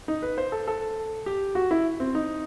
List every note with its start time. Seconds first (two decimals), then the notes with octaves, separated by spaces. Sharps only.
0.08 D#4
0.22 B4
0.38 C5
0.52 A4
0.68 A4
1.26 G4
1.55 F#4
1.71 E4
2.00 C4
2.15 D#4